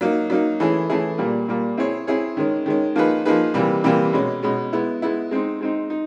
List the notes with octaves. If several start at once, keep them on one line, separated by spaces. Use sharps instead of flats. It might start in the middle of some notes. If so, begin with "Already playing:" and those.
F#3 A#3 D#4
F#3 A#3 D#4
E3 A3 C#4 E4 G#4
E3 A3 C#4 E4 G#4
A#2 G3 A#3
A#2 G3 A#3
C4 E4 G#4 C#5
C4 E4 G#4 C#5
D#3 G#3 C#4
D#3 G#3 C#4
F3 A#3 D#4 G#4 B4
F3 A#3 D#4 G#4 B4
C3 E3 G3 A#3
C3 E3 G3 A#3
B2 G#3 C#4
B2 G#3 C#4
G#3 B3 E4
G#3 B3 E4
G#3 C4 D#4
G#3 C4 D#4
D#4